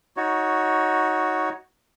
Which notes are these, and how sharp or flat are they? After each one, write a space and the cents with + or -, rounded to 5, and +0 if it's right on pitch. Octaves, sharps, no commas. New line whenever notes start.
D#4 +20 F#4 +0 C#5 +10